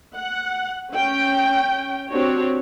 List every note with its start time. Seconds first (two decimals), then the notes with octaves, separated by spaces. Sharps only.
0.14 F#5
0.92 C#4 G5
2.11 C4 D4 F#4 G4 C#5